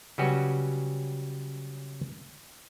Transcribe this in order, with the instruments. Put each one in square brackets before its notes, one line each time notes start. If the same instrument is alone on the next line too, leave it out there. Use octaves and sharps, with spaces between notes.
[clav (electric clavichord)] C#3 F#3 G3 C#4 F#4 B4